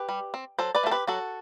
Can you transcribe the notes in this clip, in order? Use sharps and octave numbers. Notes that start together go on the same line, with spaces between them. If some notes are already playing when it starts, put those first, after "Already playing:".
Already playing: G4 B4
G3
C4
F#3 A4 C5
B4 D5
A3 C4 A4
G4 B4
F#3 F#4 A4